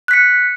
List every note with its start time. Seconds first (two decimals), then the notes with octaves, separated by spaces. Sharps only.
0.08 F#6
0.11 B6
0.13 C#7